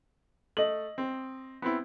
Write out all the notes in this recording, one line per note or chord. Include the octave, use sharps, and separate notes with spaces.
A3 D#5 F#7
C4
B3 C4 E4